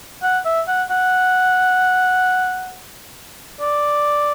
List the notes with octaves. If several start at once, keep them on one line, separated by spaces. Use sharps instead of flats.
F#5
E5
F#5
F#5
D5